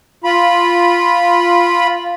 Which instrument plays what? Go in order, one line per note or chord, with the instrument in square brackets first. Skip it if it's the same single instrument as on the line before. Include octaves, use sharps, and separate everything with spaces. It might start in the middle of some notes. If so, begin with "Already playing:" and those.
[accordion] F4 B5